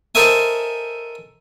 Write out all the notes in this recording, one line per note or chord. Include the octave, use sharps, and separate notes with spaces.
A4 A#4 C5 D#5 E5 G#5